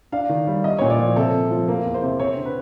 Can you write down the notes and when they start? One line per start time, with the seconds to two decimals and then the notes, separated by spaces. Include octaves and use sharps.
0.12 D4 F5
0.29 D#3
0.47 G3
0.64 B3 D#5
0.79 A#2 C#5
0.90 D5
0.99 F3
1.16 C3 A4
1.34 C3
1.51 F3
1.68 A#3
1.85 E2
1.94 C5
2.02 C3
2.20 C4 C#5
2.37 D3
2.45 B4